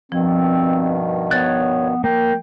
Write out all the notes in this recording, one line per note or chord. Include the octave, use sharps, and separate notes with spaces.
G2 B2 D#3 F3 C4
B3 C#5 F#6 A6
A#3 G5